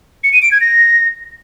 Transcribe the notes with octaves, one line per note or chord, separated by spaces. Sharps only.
C#7
D#7
D7
G#6
A#6